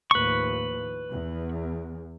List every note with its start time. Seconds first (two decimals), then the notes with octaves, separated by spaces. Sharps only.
0.11 D#2 A2 F3 B4 C#6
1.11 E2